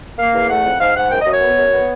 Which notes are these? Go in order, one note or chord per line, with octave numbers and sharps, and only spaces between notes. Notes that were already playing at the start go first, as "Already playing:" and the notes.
A#3 F5
E2
A3 F#5
F2
G#2 F5
G#2 F#5
F#2 G5
D#5
F#2
C#5
B3
F#2
B3